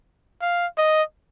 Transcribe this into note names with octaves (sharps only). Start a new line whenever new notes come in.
F5
D#5